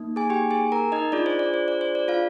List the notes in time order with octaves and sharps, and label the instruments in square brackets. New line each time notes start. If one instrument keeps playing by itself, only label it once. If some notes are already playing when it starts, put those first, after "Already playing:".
Already playing: [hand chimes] A#3 D#4
G#4 G#5
G4 G5
G#4 G#5
A#4 A#5
D#4 D#5
D4 F4 G#4 D5
C5
D5
C5
D5
C5
D5
F4 F5